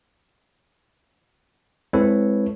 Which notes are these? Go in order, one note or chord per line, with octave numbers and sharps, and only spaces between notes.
G#3 C4 E4 A4 B4 C#5